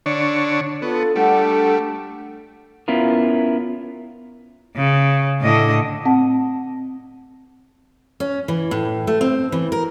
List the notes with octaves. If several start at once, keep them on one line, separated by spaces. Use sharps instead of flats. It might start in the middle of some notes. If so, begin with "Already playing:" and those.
D3 D4 C#5
B3 F4 A4
G3 A3 D4 A4 F#5
B3 C#4 E4 F4 A#4
C#3
A2 D3 D#5
C4 F#5 A5
C#4
E3
A2
A3
C4
E3
A#4